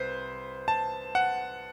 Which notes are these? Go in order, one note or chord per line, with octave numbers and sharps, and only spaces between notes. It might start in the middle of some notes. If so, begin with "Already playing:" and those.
Already playing: C2 B4 C5
A5
F#5